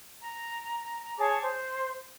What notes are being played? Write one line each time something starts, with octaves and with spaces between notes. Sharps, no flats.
A#5
G#4 C#5 A5 D6
C5